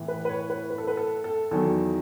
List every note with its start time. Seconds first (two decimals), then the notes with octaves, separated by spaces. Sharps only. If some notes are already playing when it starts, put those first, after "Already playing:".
Already playing: A2 E3
0.08 B4
0.25 B4
0.29 C#5
0.50 B4
0.70 B4
0.78 A4
0.87 B4
0.97 A4
1.24 A4
1.51 E2 D#3 F#3 A4